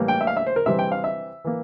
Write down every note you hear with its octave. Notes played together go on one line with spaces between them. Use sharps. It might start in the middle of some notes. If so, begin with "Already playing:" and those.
Already playing: A2 E3 G3 A#3
G5
E5
F5
E5
C5
A#4
C3 E3 G3 C4 E5
G5
F5
E5
E3 A#3